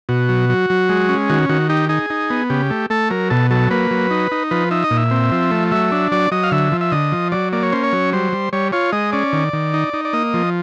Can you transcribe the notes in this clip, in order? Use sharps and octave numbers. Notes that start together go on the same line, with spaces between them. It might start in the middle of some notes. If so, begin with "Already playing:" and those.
B2 F#4
F#3
F#3
F#3
G#3
C#4
D#3 F#4
D#3 F#4
D#4 G4
D#4 G#4
D#4
B3
C#3 G4
A3
A3 A4
F#3 A#4
B2 A4
F#3 A4
A#3 B4
F#3
D#4
D#4
F3 B4
D#4 E5
D#5
A#2
E5
C4
F3
A3
F#3 E5
D4
F#3 D5
F#3 D#5
F5
D3 E5
F3
E5
D3 D#5
F3
F#3 D5
A#3 D5
C#5
C#4 C5
C#5
F#3
G3 C5
G3
G3 C#5
F4 C#5
G#3 D#5
C#4 D5
D#3
D#3
D#4
D#4
D5
A#3 D#5
F3